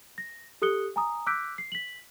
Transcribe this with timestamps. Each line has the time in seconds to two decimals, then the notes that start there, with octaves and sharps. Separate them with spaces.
0.18 A#6
0.62 G4 A4 D#6 F#6 C#7 G7
0.96 G#5 A#5 D#6
1.26 D6 E6 F#6 G6 B6 D7
1.58 C7
1.72 B6 F#7